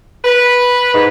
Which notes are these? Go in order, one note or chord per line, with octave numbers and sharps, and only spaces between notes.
B4
G#2